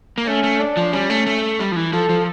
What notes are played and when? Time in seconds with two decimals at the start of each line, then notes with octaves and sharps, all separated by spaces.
0.18 A#3
0.27 A3 C#4
0.44 A3
0.60 D4
0.77 F3
0.93 G3 C#4
1.10 A3
1.26 A3
1.60 G3
1.72 F3
1.76 E3
1.93 F3 A4
2.09 F3